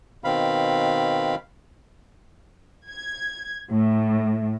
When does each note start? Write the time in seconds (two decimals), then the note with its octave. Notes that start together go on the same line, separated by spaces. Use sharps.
0.24 B2 D#3 C4 F5 B5
2.89 G#6
3.70 A2